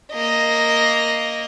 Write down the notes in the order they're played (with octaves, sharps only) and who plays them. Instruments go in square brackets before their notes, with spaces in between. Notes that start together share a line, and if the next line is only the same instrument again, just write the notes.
[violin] A#3 D#5